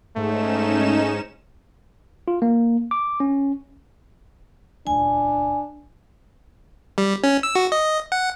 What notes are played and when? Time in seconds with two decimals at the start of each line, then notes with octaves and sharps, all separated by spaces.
0.16 G#2 A3 C#4 D#4 E7
2.28 F4
2.42 A#3
2.91 D6
3.20 C#4
4.87 D#1 C#2 D4 G#5
6.98 G3
7.24 C#4
7.43 E6
7.55 F#4
7.72 D#5
8.12 F#5